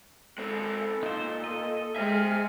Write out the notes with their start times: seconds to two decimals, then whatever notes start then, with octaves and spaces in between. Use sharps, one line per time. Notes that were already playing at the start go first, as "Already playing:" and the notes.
0.38 G#3 C4 A4
1.03 A#2 D#4 C5
1.44 D#5
1.96 G#3 G#4 C5 E5 F6